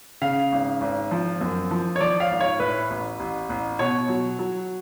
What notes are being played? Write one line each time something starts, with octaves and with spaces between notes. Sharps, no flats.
C#3 F5
G#1
G#1
F3
F#2
F3
C#5
F3 D5
F5
G#1
C#5
A2 B4
A1
A1
A1
B2 C#5
F#3
F#3